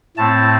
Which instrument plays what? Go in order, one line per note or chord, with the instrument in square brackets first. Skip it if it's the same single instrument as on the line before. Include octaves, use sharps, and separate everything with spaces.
[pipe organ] A2 A3 C4 A5